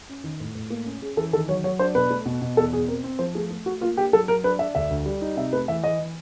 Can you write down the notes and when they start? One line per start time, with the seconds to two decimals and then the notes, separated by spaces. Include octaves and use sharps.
0.09 C#4
0.24 D#3
0.40 A2
0.55 A2
0.70 A#3
0.86 C#4
1.01 C#4 G#4
1.17 E3 A4
1.33 D#3 A4
1.48 F#3 C#5
1.64 F#3 C#5
1.79 D4 C5
1.95 B2 B4
2.10 A3
2.26 B2
2.42 B2
2.57 E2 A4
2.72 B2 G#4
2.88 C4 A#4
3.04 C4
3.19 F3 C5
3.35 A3 G#4
3.51 A3
3.66 A3 F#4
3.81 A#3 F4
3.97 D4 G4
4.13 F#3 A4
4.28 F#3 A#4
4.44 D4 B4
4.59 D4 E5
4.75 D2 E5
4.90 D2
5.06 G3
5.21 D#4
5.36 C3 E5
5.53 A3 B4
5.68 E3 E5
5.84 E3 D#5
5.99 E3